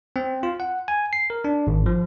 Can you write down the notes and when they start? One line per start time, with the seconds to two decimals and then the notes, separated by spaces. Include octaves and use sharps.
0.16 C4
0.43 F4
0.60 F#5
0.88 G#5
1.13 C7
1.30 A#4
1.44 D4
1.67 G#1
1.86 F3